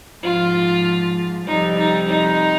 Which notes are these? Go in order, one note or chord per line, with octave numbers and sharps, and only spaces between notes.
G#2 F3 F4
F2 C3 G3 D#4
D#4
D#4